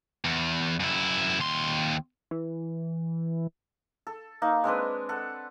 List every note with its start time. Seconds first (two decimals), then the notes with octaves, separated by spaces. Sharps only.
0.25 E2
0.80 F#2 E4
1.41 D#2 C6
2.31 E3
4.07 A4
4.42 A#3 D#4
4.64 G#3 C4 D4 B4
5.09 A4 F#5